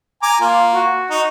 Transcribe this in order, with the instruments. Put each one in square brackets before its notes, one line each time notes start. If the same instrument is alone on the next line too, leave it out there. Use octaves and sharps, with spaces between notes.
[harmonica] G#5 A#5 D6
[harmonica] A#3 [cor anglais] F4
[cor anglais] F#4
[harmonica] D#4